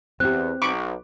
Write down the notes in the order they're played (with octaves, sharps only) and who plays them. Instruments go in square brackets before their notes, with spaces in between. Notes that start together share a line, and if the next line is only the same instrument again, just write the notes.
[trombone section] E2 [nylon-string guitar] C4 G4 [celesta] F#6
[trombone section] B1 [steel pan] B5 C#6 D6